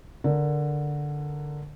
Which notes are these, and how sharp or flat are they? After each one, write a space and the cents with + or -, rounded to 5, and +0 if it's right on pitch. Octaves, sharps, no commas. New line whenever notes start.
D3 +0 A#4 +0